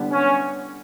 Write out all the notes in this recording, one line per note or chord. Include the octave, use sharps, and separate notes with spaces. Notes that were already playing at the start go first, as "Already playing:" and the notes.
Already playing: D3 G3 B3
C#4